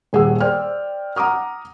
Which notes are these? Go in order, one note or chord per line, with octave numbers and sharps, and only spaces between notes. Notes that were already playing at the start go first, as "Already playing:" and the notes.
D#1 G#4 F#5 E6
C5 D5 G5 F6
F#5 A#5 D6 D#6 F6